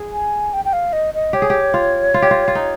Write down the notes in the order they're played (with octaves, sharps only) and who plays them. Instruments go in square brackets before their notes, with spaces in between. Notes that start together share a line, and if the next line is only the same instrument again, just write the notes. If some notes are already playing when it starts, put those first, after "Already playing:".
Already playing: [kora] G#4
[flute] G#5
G5
G5
F5
D#5
D#5
[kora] G4 [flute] C#5
[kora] G#4
G4
F4
F4
G4
F4
F4
D#4